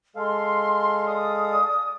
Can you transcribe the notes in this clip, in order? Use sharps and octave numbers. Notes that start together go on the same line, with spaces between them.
G#3 A4 F5 C6
D5 D#6